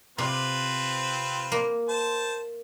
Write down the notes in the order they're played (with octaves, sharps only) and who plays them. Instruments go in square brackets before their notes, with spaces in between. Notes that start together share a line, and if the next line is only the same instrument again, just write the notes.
[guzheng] C3 [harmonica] C4 F4 B4
[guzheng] A#3
[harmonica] C5 A5